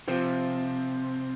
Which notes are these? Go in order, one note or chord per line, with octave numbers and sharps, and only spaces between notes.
C3 F3 C4 F4